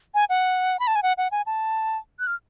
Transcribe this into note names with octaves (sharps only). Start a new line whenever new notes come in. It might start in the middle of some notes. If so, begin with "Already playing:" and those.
G#5
F#5
B5
A5
G#5
F#5
F#5
G#5
A5
F#6
F6